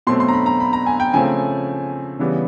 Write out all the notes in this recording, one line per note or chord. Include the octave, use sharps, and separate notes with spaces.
B2 F#3 A3 C4 C6
C6
A#5
B5
A#5
B5
A#5
G#5
G5
C#3 F3 A3 C4 G#5
C#3 E3 G3 B3